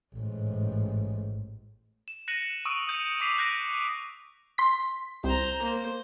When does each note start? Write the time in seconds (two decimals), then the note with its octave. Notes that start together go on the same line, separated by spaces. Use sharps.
0.15 A1 G#2
2.08 E7
2.28 F#6 A#6 C#7 D#7 E7 F#7
2.65 C#6 D#6 E6 D7 D#7
2.87 D#6 G6 C#7
3.20 C#6 D6 B6 C7 F7
3.38 F#6 G6 A#6 D7
4.58 C6 B6
5.24 C2 C5 A#5
5.62 A#3 C5